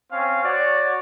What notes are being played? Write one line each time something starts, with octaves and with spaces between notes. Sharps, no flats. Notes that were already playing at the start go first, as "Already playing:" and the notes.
C4 C#4 F5
F#4 C#5 D5